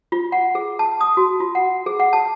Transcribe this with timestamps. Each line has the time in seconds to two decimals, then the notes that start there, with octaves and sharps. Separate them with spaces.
0.12 F4
0.32 F#5
0.55 G#4
0.79 A5
1.01 D#6
1.17 F#4
1.40 F4
1.55 F#5
1.86 G#4
2.00 F#5
2.13 A5